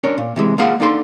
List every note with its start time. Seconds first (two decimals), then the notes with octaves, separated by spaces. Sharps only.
0.03 C#4 D4 A#4 C#5
0.18 A#2
0.36 C3 E3 G#3
0.58 A#3 F4 G#4 F5 F#5
0.80 A#3 D4 D#4 A4 G5 C6